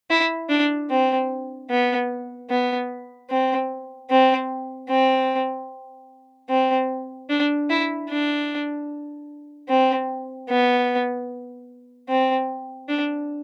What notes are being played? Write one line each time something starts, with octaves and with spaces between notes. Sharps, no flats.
E4
D4
C4
B3
B3
C4
C4
C4
C4
D4
E4
D4
C4
B3
C4
D4